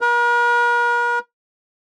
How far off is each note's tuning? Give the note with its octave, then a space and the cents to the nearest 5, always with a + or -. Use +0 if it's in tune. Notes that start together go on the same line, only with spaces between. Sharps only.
A#4 +45